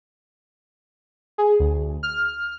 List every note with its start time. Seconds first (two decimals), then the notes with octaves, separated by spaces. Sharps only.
1.38 G#4
1.60 D2
2.03 F6